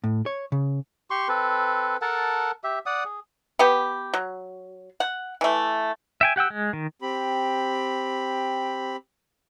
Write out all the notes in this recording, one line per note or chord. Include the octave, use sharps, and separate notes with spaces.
A2
C#5
C#3
G4 C6 C#6
C4 A4 B4
A4 A#4 F#5 A5
G4 E5
D5 F#5 D#6
G#4
B3 G4
F#3
F#5
E3 A3
E5 G5 G#5
G4 F#5 G5 E6
G#3
D#3
C4 G4 B5